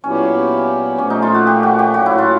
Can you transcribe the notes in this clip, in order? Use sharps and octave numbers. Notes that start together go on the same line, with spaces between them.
A#2 F#3 B3 C#4 E4 G4
A#2 F3 A3 C#4
D#4
F4
F#4
G4
F#4
G4
A2 F#3 A#3 F#4
E4
F4